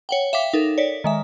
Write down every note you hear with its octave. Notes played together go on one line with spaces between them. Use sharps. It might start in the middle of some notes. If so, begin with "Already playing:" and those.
C#5 F#5 G5
E5 F5 G5 D6 B6
D#4 A4 A#4
C#5 D5 B6
D#3 G#3 E5